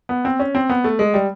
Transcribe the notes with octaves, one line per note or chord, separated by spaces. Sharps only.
B3
C4
C#4
C4
B3
A3
G#3
G3